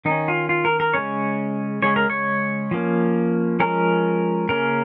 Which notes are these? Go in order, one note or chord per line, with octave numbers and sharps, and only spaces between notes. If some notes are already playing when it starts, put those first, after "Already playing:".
D#3 C#4 D#4
F4
F4
A#4
A#4
C#3 G#3 C#4 C#5
C#3 G#3 C#4 C#5
A#4
C#5
F3 A#3 C#4
F3 G#3 C#4 A#4
C#3 A#3 C#4 A#4